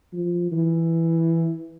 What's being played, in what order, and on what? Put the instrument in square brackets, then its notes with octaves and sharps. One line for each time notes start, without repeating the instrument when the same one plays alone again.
[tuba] F3
E3